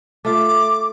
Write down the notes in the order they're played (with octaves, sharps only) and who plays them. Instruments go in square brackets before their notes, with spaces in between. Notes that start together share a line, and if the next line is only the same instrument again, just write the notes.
[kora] A3 F4 [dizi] D6